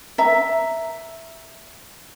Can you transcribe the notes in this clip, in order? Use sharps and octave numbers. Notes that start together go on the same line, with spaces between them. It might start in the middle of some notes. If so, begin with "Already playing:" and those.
E5 A#5